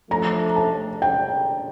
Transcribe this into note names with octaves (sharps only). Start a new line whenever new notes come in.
F3 A3 D4 A#5
A5
G5